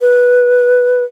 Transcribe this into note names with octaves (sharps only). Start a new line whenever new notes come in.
B4